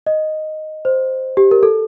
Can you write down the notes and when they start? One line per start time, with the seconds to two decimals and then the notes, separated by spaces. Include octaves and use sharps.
0.07 D#5
0.85 C5
1.37 G4
1.51 A#4
1.63 A4